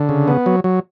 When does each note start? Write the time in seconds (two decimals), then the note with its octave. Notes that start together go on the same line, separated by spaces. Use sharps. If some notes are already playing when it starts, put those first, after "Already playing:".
Already playing: D3
0.09 C#3
0.28 B3
0.46 F#3
0.64 F#3